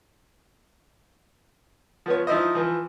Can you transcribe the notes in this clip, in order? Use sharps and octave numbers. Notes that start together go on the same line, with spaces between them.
F3 B3 C#5
F3 D#4 E4 C5 D#5
E3 F3